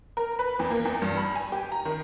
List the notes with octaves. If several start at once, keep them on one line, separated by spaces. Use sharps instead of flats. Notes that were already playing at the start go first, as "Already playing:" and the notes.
A#4
B4
E2
A#3
E2
G2
B5
G#5
G4
A#5
D#3